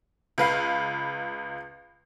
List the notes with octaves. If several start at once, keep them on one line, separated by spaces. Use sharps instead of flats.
C#2 B4 F5